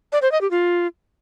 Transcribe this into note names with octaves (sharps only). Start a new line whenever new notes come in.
D5
C5
D#5
G4
F4